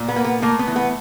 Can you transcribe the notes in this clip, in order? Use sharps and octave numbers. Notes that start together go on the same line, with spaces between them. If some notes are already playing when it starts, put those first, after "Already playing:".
Already playing: A#2
B3
A#3
B3
A3 A#3
B3
E3
B3